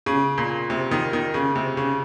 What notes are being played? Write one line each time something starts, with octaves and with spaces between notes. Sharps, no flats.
C#3
A#2
C3
D#3
D#3
C#3
C3
C#3